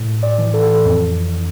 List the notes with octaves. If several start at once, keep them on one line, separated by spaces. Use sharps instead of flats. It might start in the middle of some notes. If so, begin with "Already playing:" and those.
Already playing: A2
D5
E3
A4
F2